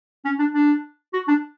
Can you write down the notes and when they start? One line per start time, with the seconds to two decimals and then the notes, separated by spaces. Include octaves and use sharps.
0.25 C#4
0.39 D4
0.54 D4
1.13 F#4
1.28 D4